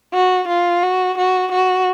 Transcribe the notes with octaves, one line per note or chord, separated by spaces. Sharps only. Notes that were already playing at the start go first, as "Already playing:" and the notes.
F#4
F4
F#4
F#4
F#4